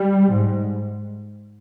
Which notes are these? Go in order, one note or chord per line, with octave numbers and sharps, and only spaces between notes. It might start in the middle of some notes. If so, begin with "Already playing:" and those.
Already playing: G3
G#2